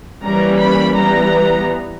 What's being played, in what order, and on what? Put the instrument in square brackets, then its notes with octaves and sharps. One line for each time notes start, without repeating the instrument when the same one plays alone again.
[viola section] E3 G3 A#3 C#4 A#5
B5
E3 G3 B3 A#5